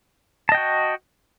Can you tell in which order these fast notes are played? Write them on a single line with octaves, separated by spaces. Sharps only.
A5 D#5 G5 F#4